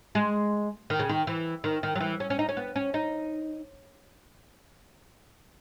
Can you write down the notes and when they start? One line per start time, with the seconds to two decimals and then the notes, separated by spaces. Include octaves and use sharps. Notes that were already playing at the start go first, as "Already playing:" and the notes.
0.15 G#3
0.90 D#3
0.99 C#3
1.09 D#3
1.27 E3
1.64 D#3
1.83 D#3
1.95 F#3
2.00 E3
2.20 C#4
2.30 C#4
2.39 D#4
2.49 C#4
2.57 B3
2.76 C#4
2.94 D#4